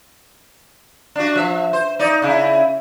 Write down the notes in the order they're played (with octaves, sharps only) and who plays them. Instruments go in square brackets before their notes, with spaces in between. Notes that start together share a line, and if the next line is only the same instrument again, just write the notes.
[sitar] D4 F#4
F3 E5
C5
D#4 D5
C#3 E4